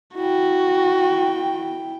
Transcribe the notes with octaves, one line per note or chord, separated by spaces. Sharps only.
E4 F#4 G5